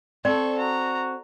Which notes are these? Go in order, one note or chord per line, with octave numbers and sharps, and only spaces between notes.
C4 A4 D5 C#6
F#4 A#5